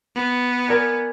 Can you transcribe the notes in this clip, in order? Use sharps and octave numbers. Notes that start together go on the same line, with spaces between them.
B3
A#4 D5 G#5